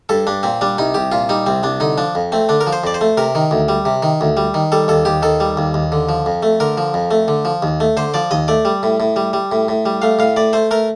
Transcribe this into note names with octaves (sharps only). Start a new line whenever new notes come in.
G2 A4
G2 D4
A#2 C4
G3 D4
C2 D#4
C2 G4
A#2 F4
G3 D#4
C2 C4
C2 D4
D3 D#4
F3 D4
F2
A3 C4
D3 D4
A#4
F3
C5
F2 D5
C5
A3
C3 A#4
D#3
D2
G3
C3
D#3
D2
G3
D#3
G3 A4
D#2 A4
D#2 G4
D#3 A4
G3
D#2
D#2
D3
F3
F2
A3
D3 A#4
F3
F2
A3
D3
F3
D#2
A3
D3 C5
F3 D5
D#2 D#5
A3 D5
G3
A2
A2
G3
G3
A2
A2
G3
A3 F5
A2 F5
A2 D5
A3 C5
A3 A#4